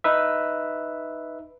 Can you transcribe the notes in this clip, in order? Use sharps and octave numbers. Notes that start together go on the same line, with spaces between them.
D#4 B4 E5